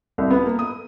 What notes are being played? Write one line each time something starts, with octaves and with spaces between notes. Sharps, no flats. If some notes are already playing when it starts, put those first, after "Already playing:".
C2
B3
A#3
D#6